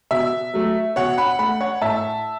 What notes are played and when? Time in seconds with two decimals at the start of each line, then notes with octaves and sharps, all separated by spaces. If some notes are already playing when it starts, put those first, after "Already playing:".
0.11 B2 E5
0.54 F#3 A3
0.96 B2 C#5 F#5
1.18 F#5 B5
1.39 A3 F#5 B5
1.60 C#5 F#5
1.81 A2 E5 A5